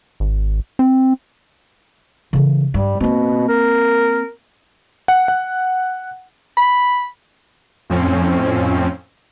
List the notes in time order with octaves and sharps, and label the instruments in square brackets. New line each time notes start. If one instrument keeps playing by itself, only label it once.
[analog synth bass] G#1
C4
[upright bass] C#3 E3
[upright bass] G2 [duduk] G3
[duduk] B2 [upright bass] A#3 C4
[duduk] A#4
[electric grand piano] F#5
F#5
[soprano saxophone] B5
[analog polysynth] F2 A2 F3 C4 C#4